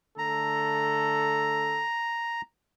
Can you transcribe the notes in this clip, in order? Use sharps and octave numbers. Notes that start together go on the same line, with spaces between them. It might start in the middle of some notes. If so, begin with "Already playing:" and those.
D3 A3 A4 A#5